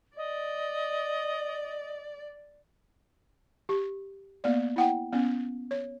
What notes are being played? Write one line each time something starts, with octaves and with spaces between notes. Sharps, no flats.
D5 D#5
G4
A#3 B3 D5
E4 F#5 G5
B3 C#4
C#5